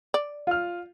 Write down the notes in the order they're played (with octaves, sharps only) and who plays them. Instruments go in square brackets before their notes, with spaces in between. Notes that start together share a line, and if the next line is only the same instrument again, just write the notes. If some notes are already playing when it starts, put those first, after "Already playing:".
[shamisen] D5
[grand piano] F4 F6